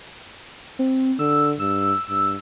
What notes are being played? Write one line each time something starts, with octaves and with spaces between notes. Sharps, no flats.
C4
D3 E6
G2 E6
G2